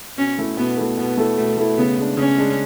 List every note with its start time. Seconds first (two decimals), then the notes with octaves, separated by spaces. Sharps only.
0.18 B2 C#4
0.38 A3 E4 A4
0.57 B2 B3
0.77 A3 E4 A4
0.97 B2 B3
1.17 A3 E4 A4
1.37 B2 A3
1.58 A3 E4 A4
1.77 C#3 B3
1.97 G#3 D4
2.17 C#3 C#4
2.38 G#3 D4